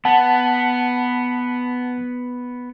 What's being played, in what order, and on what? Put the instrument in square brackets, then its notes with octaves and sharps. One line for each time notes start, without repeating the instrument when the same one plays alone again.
[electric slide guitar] B3 [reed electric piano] F#5 A5